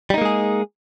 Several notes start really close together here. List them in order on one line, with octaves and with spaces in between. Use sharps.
G3 D#4 A#3 G#3 G#4